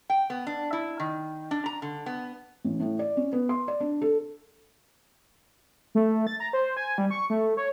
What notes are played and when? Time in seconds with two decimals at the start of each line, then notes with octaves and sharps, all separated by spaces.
0.10 G5
0.30 B3
0.47 D4
0.73 E4
1.00 D#3
1.51 D4
1.66 A#5
1.82 D3
2.06 B3
2.64 A1
2.80 A2
2.99 D5
3.17 C#4
3.33 B3
3.49 C6
3.68 D5
3.80 D4
4.02 A4
5.95 A3
6.27 A6
6.40 A#5
6.53 C5
6.77 G#5
6.98 G3
7.10 C#6
7.30 A3
7.57 C#5